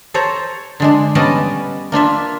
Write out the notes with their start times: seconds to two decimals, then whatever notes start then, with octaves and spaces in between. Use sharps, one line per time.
0.14 A4 C5 C#5 A#5
0.80 D3 G#3 D4
1.15 G3 B3 C#4 D5 D#5 A5
1.92 A#3 D4 F4 E5